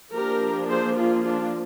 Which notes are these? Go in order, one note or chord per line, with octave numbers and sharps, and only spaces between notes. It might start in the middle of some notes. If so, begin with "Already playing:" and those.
F3 A#3 D4 G4 A#4
G#4 C5
F4 G#4
D4 F4